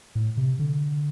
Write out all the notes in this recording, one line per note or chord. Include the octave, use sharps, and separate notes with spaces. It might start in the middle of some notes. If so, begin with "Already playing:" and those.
A2
C3
D3